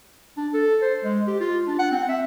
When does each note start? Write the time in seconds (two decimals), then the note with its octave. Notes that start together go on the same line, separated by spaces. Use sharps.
0.37 D4
0.53 A4
0.82 C5
1.04 G#3
1.27 G4
1.40 F4
1.67 D4
1.79 F#5
1.92 C4
2.09 E5